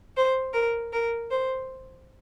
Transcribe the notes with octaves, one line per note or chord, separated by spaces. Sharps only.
C5
A#4
A#4
C5